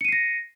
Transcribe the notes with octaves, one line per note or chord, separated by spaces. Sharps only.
A#6 C7 C#7 D#7